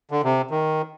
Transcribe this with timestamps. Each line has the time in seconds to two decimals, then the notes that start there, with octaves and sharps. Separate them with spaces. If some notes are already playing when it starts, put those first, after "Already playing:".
0.11 D3
0.24 C3
0.51 D#3